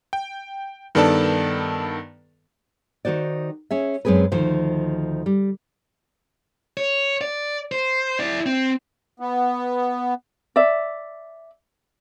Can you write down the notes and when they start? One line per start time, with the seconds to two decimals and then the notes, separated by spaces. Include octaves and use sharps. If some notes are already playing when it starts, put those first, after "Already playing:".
0.13 G5
0.95 G2 D#3 B3 A4 D5 A5
3.05 D#3 D#4 F#4 C5 D5
3.71 C#4 G#4 E5
4.05 F#2 G#3 C4 G#4 B4
4.32 D2 D#3 F3 C5
5.26 G3
6.77 C#5
7.21 D5
7.72 C5
8.20 E4 D5
8.46 C4
9.20 B3
10.56 D5 E5